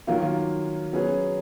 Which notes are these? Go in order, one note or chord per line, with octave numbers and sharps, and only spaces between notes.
D#3 F#3 A#3 F4
F#3 C#4 G#4 B4